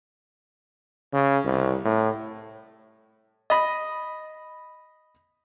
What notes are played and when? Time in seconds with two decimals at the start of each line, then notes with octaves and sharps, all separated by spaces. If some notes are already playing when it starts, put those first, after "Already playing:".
1.13 C#3
1.45 C2
1.84 A2
3.50 D#5 B5